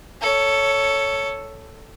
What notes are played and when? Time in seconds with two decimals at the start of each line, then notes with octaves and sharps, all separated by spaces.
0.22 A4 C#5